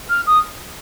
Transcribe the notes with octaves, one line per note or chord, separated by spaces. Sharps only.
F6
D#6